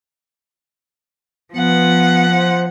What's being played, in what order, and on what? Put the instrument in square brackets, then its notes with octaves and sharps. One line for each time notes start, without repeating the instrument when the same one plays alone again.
[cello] F3 F#5 [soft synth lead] B3
[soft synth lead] C5